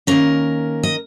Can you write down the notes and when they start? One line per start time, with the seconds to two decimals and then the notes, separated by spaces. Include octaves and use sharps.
0.07 D#3 A#3 C#4 A#4
0.83 D#5